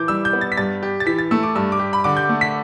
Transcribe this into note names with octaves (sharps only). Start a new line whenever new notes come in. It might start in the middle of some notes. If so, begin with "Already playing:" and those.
Already playing: E3 D6 G6
G3 E6
G6
B3
A6
B6
G2 A6
G4
A6
E3 B6
A6
A3 E6
D6
G2 E6
D6
G4
B5
D3 D6
G6
A3
B6